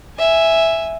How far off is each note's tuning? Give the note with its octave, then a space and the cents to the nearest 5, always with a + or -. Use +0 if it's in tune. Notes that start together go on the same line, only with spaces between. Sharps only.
E5 +0 G#5 +0